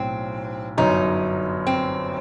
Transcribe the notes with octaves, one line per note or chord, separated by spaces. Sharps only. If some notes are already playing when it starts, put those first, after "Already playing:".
Already playing: B1 A2 F#3 C4
G1 F#2 F#3 D#4
C4